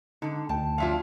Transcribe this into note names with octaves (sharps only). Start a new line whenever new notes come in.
G#2 D3 D#4
D2 G5 A5
F3 F#3 D4 F4 E5 F5